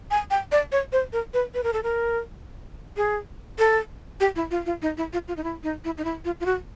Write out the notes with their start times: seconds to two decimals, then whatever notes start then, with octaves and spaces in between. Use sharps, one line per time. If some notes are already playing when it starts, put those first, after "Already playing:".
0.11 G#5
0.31 G5
0.52 D5
0.72 C#5
0.92 C5
1.13 A#4
1.34 B4
1.54 B4
1.63 A#4
1.73 A4
1.83 A#4
2.97 G#4
3.59 A4
4.20 G4
4.36 E4
4.51 F4
4.66 F4
4.82 D#4
4.97 E4
5.13 F4
5.28 F4
5.37 D#4
5.44 E4
5.63 D#4
5.84 E4
5.97 D#4
6.04 E4
6.25 F4
6.40 F4
6.46 F#4